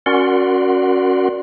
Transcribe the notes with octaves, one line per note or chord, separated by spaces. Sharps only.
C#4 F#4 A#4 D5 F#5 C6